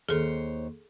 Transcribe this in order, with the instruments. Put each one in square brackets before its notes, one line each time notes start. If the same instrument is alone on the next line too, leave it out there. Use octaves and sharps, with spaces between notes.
[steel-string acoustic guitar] D#2 C5 C#5 [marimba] G#4 A4